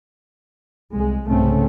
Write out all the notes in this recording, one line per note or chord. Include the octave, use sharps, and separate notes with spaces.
C2 G#3
C2 G#2 C#3 A3 C4 C#4